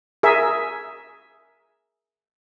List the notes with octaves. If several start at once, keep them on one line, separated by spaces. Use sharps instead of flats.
G#4 A#4 E5